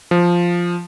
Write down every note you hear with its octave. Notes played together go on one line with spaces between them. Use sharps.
F3